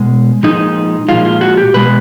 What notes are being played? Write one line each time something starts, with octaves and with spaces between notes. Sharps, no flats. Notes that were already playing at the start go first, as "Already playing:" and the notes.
Already playing: B2 G#3
A#2 F3 G#3 D#4
A#2 F3 G#3 F4
F4
F#4
G4
B2 G#3 B4